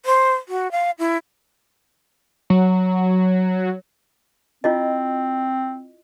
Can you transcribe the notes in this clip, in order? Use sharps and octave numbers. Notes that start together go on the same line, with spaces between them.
C5
F#4
F5
E4
F#3
C4 E4 F4 D#5